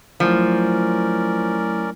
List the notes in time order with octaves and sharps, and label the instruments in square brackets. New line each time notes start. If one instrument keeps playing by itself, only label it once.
[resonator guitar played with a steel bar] F3 [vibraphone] F#3 A3 E4 [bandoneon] C#4 A#4 D5